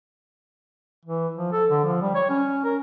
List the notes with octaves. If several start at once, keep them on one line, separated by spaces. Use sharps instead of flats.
E3
F3
A4
D3
F3
G3
C#5
C#4
A#4